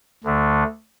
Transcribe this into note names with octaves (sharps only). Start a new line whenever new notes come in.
D2 D3 A3